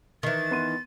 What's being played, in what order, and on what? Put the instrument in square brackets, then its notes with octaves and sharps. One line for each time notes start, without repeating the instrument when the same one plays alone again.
[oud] D#3 E3 [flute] A6
[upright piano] B3 C6 D#7